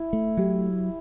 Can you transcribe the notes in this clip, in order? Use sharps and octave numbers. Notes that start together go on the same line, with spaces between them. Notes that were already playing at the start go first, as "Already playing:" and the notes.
Already playing: E4
A3
F#3 G4